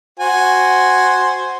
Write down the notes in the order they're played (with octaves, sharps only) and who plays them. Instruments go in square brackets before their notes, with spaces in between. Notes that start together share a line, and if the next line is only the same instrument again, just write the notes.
[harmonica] F#4 C5 G#5